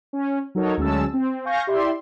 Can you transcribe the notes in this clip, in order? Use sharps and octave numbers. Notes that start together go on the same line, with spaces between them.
C#4
F#3 D#4 A4 A#4 C#5
D2 F#3 G#3 C#4 A5 E6
C4
F5 G#5 C#6 G6 A#6
E4 G4 D5 E5 C6